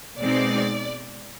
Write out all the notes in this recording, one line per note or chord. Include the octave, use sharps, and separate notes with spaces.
B2 G#3 C4 D#4 D5